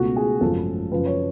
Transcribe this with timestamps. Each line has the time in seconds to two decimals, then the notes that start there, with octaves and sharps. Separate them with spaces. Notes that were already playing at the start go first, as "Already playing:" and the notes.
Already playing: C#2 B2 A3 F#4
0.16 G#4
0.41 G#1 F#2 C#3 F3 A3 A4
0.92 F#2 C#3 F3 B4
1.06 C#5